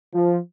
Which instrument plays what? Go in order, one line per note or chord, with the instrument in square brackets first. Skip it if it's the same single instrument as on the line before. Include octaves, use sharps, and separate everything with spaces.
[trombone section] F3